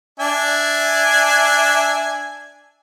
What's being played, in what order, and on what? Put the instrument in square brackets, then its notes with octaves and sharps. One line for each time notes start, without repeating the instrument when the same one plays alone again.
[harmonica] D4 E5 G#5